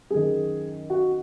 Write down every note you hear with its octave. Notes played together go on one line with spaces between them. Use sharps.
F#2 D#3 G#4
F#4